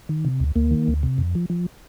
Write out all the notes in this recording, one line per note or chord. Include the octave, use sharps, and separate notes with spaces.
D#3
C3
D2
D2 A#3
D#3
D2
C3
F2
F3
F3